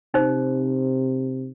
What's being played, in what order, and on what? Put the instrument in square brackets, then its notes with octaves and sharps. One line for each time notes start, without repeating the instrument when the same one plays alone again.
[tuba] C3 [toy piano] D#4 C5